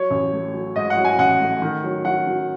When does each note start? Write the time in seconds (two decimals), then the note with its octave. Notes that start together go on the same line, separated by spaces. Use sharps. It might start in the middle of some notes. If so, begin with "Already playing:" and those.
Already playing: F#3 C#5
0.11 A1
0.33 A3
0.54 F#3
0.76 G#2 D#5
0.90 F#5
0.97 F#3
1.05 G#5
1.19 A1 F#5
1.40 A3
1.62 D#3
1.84 F#3
2.05 F#3 F#5
2.27 F#3